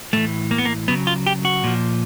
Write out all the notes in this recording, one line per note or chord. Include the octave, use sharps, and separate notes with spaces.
A2 E3 A3
A#3
B3
A#3
C#3 F#3 B3
F4
G4
F#4
A#2 F3